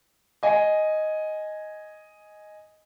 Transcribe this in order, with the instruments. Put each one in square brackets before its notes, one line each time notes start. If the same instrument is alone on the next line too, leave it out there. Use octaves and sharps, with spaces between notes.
[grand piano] D#5 G#5